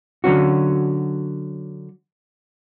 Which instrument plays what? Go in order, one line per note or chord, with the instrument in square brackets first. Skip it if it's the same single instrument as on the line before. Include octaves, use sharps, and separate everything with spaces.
[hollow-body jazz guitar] D3 F#3 C#4 F#4